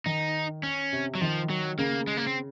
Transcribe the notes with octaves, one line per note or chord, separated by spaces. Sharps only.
D#3 D#4
C#4
C3
F#3
D#3 F3
F#3
C#3 A#3
G#3
A#3
C4